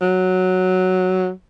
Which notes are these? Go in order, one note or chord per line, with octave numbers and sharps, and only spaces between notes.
F#3